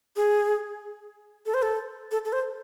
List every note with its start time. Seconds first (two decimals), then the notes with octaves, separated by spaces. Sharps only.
0.16 G#4
1.46 A4
1.54 C5
1.62 A4
2.11 A4
2.25 A4
2.33 C5